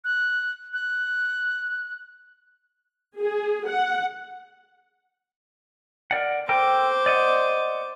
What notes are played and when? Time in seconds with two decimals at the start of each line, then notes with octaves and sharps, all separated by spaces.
0.04 F#6
0.73 F#6
3.19 G#4
3.69 F#5
6.11 A#4 D5 F#5
6.49 A4 A#4 C5 G5 D6
7.06 D5 D#5 F#5